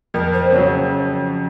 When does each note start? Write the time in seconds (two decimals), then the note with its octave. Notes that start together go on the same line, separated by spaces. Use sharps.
0.14 F2 A#4
0.33 C5
0.52 C#3 F#3 C#5